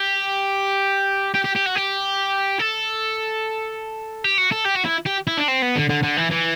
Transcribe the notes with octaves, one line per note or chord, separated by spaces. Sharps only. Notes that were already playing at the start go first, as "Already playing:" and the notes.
Already playing: G4
G4
G4
G4
F#4
G4
A4
G4
F#4
A4
G4
F#4
E4
G4
E4
D4
C4
B3
D3
D3
D3
E3
E3